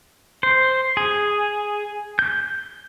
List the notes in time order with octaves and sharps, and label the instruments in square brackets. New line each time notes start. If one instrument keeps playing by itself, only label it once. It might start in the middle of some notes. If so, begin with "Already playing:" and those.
[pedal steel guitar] C5
G#4
G6